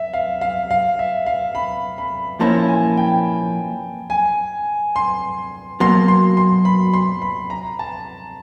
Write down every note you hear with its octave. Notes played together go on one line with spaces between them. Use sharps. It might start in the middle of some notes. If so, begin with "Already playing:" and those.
Already playing: E5
F5
F5
F5
E5
F5
B5
B5
A#2 F3 A#3 C#4 E4 A5
G#5
G5
G#5
C6
B2 F#3 A#3 C6
C6
C6
B5
C6
B5
A#5
A5